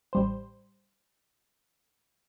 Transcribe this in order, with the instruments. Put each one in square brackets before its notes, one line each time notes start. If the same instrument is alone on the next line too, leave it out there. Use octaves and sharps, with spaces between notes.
[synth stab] A1 G3 C5